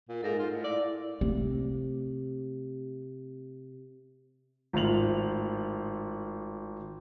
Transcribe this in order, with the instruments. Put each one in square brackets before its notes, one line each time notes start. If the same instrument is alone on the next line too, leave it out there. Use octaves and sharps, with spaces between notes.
[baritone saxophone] A#2
[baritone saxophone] G#2 [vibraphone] A4 A#4 F5
[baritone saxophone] F4
A2
[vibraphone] E4 F5 [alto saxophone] D5
[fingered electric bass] C3 [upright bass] A3
[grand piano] G#1 A2 F4 F7 F#7